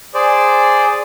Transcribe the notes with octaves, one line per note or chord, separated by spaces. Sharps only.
G#4 C5 D5